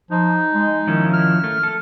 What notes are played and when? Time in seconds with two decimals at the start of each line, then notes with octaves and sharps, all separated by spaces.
0.11 F3 D#4
0.54 G#3
0.87 D#3 F3 C#4 E4
1.13 F6
1.44 A3
1.63 A4